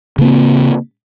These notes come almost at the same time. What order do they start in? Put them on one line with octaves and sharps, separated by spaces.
C#3 A#3 C4